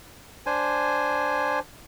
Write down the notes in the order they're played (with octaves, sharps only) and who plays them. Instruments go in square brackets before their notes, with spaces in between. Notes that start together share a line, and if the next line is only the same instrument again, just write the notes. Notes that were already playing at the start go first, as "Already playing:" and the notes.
[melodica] D4 C5 G#5